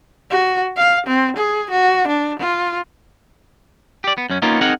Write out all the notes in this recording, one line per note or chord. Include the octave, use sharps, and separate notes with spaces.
F#4
F5
C4
G#4
F#4
D4
F4
G4 D5
B3
F#2 C#4
A#3 B3 C#4 D#4 F4
C4 D#4 G#4 A#4 F#5